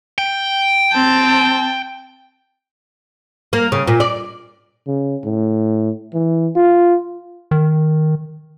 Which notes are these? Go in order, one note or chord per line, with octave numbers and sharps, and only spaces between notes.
G5
C4 A5
A#3
C#3
A#2
D5
C#3
A2
E3
F4
D#3